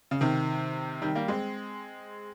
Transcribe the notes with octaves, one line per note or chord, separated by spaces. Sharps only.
C#3
C3 D#3
D#3 G3
G3 A#3
G#3 C4